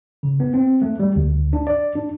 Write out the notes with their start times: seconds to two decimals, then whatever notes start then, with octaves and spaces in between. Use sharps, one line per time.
0.23 C#3
0.40 B3
0.54 C4
0.82 A3
1.00 G3
1.16 D2
1.53 D4
1.67 D5
1.96 D4